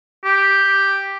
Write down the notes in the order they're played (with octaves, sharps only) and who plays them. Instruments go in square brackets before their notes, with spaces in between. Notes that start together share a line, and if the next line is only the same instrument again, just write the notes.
[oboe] G4